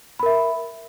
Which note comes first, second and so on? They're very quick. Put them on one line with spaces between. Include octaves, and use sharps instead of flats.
B5 A#4 E5